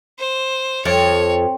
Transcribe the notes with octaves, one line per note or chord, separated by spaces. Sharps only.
C5
F2 C#5